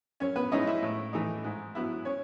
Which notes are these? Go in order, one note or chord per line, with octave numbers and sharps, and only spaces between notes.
F#2 C#4 C#5
B3 B4
C#3 G#3 C#4 D#4 E4 D#5
E4 E5
A2
E3 A3 D#4
G#2
F#3 B3 E4
C#4 C#5